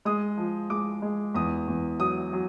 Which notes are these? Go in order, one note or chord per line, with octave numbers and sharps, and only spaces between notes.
G#3 D#6
F3
G#3 D6
G#3
E2 D#6
E2
F#3 D#6
F#3